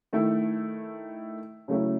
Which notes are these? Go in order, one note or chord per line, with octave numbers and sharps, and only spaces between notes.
D#3 A3 E4
C#3 F#3 A3 C#4 E4